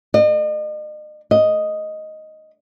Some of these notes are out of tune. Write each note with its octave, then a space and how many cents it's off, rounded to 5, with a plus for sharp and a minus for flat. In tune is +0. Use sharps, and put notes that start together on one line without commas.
D#5 -40
D#5 +0